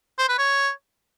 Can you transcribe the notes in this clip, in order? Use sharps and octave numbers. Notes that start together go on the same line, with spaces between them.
C5
B4
C#5